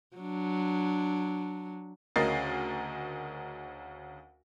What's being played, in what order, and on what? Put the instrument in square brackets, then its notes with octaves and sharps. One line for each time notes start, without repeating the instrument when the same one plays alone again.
[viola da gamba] F#3 D4
[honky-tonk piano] D2 C#3 A#4 D#5 A6 C7